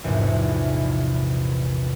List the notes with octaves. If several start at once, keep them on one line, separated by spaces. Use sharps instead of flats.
A#1 E2 G#2 C3